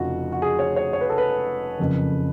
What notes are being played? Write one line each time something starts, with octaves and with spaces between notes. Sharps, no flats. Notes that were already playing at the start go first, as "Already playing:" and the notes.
Already playing: F1 F2 C#3 F4 F#4
F#4
G#4
C#5
C#5
C#5
B4
A4
B4
F#1 F2 C#3